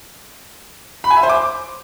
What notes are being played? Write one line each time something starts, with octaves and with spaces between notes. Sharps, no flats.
B5
G#5
E5
C5
D6